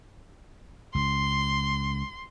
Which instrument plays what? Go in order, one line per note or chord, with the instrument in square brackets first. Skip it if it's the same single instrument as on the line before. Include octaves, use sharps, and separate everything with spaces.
[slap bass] C#2 [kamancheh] C6